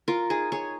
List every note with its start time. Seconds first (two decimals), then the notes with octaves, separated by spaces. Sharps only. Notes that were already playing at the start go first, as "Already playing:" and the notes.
0.08 F4 A#4
0.30 D#4 G#4
0.52 G#4 C#5